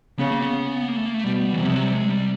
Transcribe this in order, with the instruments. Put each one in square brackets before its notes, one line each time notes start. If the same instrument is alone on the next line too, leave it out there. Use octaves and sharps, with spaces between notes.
[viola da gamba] C#3 [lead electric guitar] B3
[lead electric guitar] A#3
B3
A#3
A3
A#3
A3
[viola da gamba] B2 [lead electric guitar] G3
[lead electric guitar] E3
[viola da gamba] C3 [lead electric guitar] F3
[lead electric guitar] F#3
G3
G#3
G3